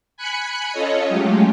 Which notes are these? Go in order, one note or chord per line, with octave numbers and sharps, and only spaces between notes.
G#5 B5 F#6 C#7
C#4 F4 A4 C#5 D#5
F#3 G#3 A3 C#4 F4 G4